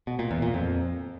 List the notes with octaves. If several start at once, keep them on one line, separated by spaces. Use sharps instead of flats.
B2
A#2
E2
A#2
F2